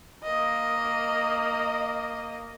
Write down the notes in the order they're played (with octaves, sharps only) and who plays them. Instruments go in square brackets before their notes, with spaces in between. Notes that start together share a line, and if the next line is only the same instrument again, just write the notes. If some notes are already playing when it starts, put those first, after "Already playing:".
[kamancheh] A#3 D#5